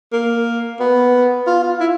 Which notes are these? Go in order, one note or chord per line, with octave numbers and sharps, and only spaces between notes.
A#3
B3
F4
F4
E4